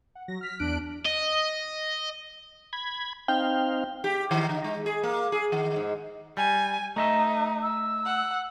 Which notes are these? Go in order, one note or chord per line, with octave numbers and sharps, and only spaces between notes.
F#5
F#3 A#6
F6 B6
E2 D4 F#6 D7
D#5
B5 G#6
C4 D#4 F5 G5
G4
D#3
D3
G#3
G#4
A#3
G#4
D#3
G#2
G3 G#5
A3 D#4 D#5 E5
E6
F#5